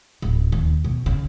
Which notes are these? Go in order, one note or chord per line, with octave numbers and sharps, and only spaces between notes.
D1
D#2
B2
C#3